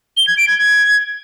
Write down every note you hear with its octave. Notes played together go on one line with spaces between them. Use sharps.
G7
G#6
D7
G#6
G#6